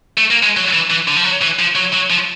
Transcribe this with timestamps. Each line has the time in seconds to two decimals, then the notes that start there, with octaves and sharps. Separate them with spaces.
0.17 A3
0.30 A#3
0.43 G#3
0.57 F#3
0.73 E3
0.90 E3
1.08 D3
1.16 F3
1.24 F#3
1.42 E3
1.59 F3
1.75 F#3
1.93 F#3
2.10 F3